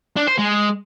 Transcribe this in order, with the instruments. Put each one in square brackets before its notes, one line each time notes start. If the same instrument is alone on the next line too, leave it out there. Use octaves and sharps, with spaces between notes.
[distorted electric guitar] D4
C5
G#3